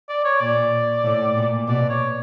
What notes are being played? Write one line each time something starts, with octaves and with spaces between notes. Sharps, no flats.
D5
C#5
A#2 D5
A2
A#2
B2 D5
C#5